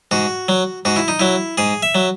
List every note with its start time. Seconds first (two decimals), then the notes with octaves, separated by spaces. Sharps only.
0.11 G#2 F#4
0.48 F#3
0.85 G#2 F#4
0.96 E4
1.08 D#4
1.19 F#3 E4
1.58 G#2 G#4
1.83 E5
1.95 F#3